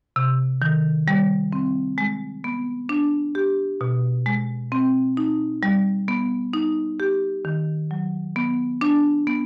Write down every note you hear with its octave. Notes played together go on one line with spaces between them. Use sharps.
C3
D#3
G3
C4
G#3
B3
D4
G4
B2
G#3
C4
D#4
G3
B3
D#4
G4
D#3
F#3
B3
D4
B3